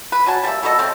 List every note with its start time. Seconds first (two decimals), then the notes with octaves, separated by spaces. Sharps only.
0.12 B4
0.27 F#3 F#4 G#5 A5
0.43 G3 A#3 C#5 E5
0.63 B2 A3 A4 D#5
0.78 C#3 A3 C4